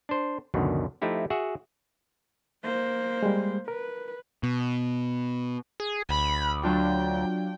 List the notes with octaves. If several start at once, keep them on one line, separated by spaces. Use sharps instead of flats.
D4 C5
C#2 F#2 B2 D3 D#3
F3 A3 D#4 E4 G4
F#4 G#4 E5 F#5
A#3 C5
G3 G#3
A#4 B4
B2
G#4
D2 B5
F#3 D4 F4 G5